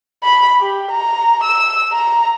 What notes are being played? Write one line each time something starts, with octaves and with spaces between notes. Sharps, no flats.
B5
G4
A#5
E6
A#5